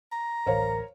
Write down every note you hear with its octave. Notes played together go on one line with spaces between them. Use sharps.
A#5
D1 A1 D2 A#4 C5 C#5 F5